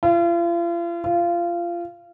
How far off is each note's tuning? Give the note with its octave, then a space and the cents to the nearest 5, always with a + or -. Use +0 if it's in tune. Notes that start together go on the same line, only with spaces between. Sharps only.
F4 -40
F4 -20